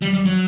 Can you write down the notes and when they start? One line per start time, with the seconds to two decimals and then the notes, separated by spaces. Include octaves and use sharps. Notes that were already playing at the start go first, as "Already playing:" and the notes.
0.02 G3
0.14 G3
0.26 F#3